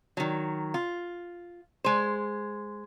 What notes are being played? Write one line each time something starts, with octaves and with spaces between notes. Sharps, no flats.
D#3 F#3
F4
G#3 C5